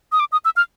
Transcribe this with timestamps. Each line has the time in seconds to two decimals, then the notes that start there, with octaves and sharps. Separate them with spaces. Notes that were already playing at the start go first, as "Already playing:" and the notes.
0.12 D#6
0.20 D6
0.32 D#6
0.45 E6
0.56 F6